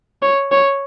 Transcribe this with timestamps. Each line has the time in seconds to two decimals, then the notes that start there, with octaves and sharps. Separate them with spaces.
0.22 C#5
0.52 C#5